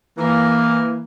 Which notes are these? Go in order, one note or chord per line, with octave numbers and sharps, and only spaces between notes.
E3 A#3